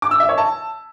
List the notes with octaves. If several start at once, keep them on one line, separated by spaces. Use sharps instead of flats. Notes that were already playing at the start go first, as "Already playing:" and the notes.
D6
E6
E5
C#5
A5